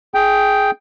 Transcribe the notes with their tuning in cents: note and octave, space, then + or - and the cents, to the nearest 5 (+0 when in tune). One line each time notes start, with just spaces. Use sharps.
G#4 +10 G5 +0